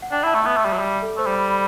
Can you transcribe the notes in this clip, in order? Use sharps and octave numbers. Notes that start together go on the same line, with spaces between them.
F#5
D4 G5
E4 A5
A3
B3 E5
A3
G3
F#3
G3
A4
A3 C5
G3
B5
B5